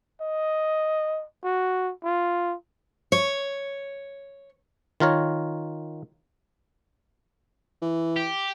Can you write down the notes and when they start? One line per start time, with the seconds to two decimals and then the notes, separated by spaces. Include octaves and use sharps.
0.21 D#5
1.44 F#4
2.04 F4
3.12 C#5
5.00 D#3 F4 A#4 C#5
7.82 E3
8.16 G4